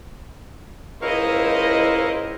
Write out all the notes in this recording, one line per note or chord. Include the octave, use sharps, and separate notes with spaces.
C#2 E4 A#4 C5 D#5 F5 C#6